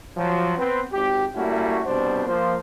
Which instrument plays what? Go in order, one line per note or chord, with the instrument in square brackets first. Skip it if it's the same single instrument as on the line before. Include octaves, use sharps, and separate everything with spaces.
[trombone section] F3 F#3
B3 C4 B4
G#1 G4
G3 A3 A#3 C#4 E4 F#4
C2 B2 G3 D4 C5
F3 A#3 C5